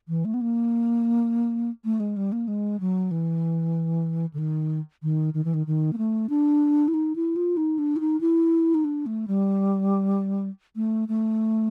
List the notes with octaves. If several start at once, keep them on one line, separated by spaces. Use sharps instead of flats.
E3
A3
B3
A#3
A3
G#3
G3
A#3
G#3
F#3
E3
D3
D#3
D#3
D#3
E3
D#3
D#3
A#3
A3
D4
E4
D#4
E4
F4
D#4
D4
E4
D#4
E4
D#4
D4
A3
G3
A3
A3